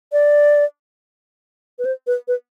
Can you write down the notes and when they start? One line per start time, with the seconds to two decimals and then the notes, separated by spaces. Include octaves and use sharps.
0.12 D5
1.79 B4
1.85 C5
2.07 B4
2.28 B4